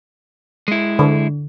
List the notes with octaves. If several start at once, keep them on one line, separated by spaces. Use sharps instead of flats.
G#3 E4
D3